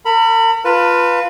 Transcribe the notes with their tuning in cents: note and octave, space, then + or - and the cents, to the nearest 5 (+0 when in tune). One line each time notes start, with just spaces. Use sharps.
A#4 -45 B5 -5
F4 +0 B4 +0 A5 +40